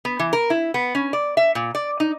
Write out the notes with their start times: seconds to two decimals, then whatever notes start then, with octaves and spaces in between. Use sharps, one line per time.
0.05 B3
0.19 E3
0.33 A#4
0.50 E4
0.74 B3
0.95 C#4
1.13 D5
1.37 E5
1.55 A#2
1.75 D5
2.00 D#4